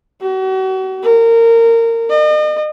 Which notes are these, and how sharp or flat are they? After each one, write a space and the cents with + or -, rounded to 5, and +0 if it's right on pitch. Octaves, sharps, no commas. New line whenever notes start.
F#4 +40
A#4 -20
D#5 -40